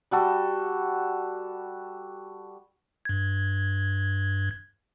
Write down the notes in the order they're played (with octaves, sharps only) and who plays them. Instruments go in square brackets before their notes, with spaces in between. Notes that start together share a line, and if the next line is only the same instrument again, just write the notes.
[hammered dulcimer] G3 F#4 A4
[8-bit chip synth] G2 G#6